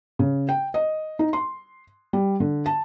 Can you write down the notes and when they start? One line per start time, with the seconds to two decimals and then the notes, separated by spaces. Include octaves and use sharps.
0.19 C#3
0.49 G5
0.74 D#5
1.19 D#4
1.33 C6
2.13 G3
2.40 D3
2.66 A5